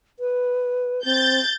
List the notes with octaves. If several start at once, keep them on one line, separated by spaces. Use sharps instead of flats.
B4
C4 G6 A6